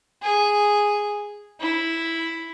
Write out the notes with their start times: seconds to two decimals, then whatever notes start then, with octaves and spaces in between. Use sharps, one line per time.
0.23 G#4
1.61 E4